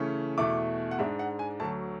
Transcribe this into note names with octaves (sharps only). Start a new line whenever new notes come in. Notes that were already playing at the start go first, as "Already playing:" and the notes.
Already playing: C#3 E3 A3 C#4
E2 B2 A3 E4 D6
F#5
G#2 G#3 D4 E5
F#5
G#5
D2 D3 F#3 A5